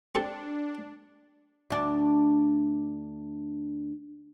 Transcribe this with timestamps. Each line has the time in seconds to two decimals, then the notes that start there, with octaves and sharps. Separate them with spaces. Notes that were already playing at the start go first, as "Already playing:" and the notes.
0.15 C4 D4 G4 A4
1.70 D2 D4